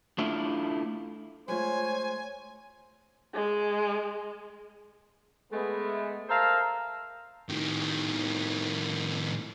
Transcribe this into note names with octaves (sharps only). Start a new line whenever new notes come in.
A3 D4 E4 F4
G#3 A3 F4 C5 C#5 G#5
G#3
G#3 A3 B3
A#4 C5 E5 F5 A5 A#5
A2 D#3